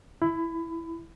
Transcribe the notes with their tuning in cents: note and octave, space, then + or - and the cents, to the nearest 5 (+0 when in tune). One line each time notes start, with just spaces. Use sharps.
E4 +0 B5 +25